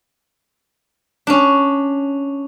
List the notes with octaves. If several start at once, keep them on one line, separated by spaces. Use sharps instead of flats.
C#4 D4